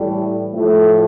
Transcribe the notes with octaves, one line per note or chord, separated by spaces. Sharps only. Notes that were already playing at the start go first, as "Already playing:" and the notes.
Already playing: A2 E3 G3
A2 F3 A3